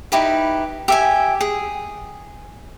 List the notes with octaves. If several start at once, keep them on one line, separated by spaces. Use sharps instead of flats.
D#4 E4 G4 B4
G4 E5 G#5
G#4